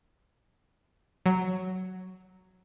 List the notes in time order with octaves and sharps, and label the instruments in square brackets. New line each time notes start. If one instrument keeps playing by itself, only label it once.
[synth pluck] F#3